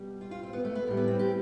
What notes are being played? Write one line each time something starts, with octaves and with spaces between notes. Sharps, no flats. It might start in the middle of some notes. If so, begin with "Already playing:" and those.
Already playing: B2 G3
F4
F4
C4
B3
A3
B3
A2 E3 G3
B3
C4
G4